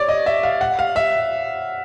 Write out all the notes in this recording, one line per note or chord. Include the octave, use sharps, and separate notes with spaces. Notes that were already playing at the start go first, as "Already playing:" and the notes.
Already playing: C#5 D5
D#5
E5
F5
F#5
F5
E5